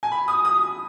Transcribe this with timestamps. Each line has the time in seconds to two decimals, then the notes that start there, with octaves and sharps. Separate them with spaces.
0.03 G#5
0.12 B5
0.28 D#6
0.45 D#6